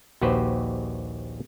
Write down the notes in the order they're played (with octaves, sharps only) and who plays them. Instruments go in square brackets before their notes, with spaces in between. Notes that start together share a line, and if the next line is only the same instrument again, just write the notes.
[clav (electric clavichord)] A#1 D#2 F#4 G4 B4 C5